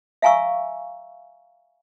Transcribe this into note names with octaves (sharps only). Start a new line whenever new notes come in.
E5 F5 G#5 A#5 C#6 E6